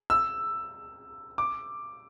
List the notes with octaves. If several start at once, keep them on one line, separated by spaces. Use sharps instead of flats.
E6
D6